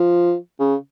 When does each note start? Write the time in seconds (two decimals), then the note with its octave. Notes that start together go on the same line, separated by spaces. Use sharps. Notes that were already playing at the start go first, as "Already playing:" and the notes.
Already playing: F3
0.60 C#3